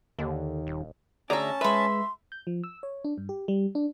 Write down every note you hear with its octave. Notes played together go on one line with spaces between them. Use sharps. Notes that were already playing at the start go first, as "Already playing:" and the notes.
D#2 D3
D#1
D2 C#4 G#4 D5 E5 A5 A#5
G#3 B4 E5 B5 C6
G6
F3
E6
C#5
D4
G2
G4
G3
D4